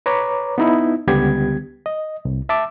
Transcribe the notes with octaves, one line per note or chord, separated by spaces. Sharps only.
B4 C#5 A#5 D6
B3 D#4 E4
C#2 D3 G3 B3 G4 G#6
D#5
C2
E5 A5 D6 E6